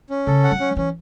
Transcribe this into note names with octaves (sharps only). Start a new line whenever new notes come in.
C#4
C#3 A4
F#5
F#3
C#4
E3 C#4